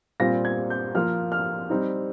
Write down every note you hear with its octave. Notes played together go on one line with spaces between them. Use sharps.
A#2 G3 C4 F4 A#6
G#6
G6
F3 A#3 F4 F6
F6
G3 C4 D#4